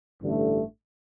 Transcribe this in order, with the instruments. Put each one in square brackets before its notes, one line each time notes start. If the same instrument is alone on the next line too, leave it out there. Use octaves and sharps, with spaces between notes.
[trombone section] A1 G2 D3 A3